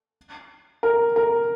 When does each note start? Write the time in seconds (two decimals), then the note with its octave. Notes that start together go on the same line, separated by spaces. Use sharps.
0.83 A#4
1.16 A#4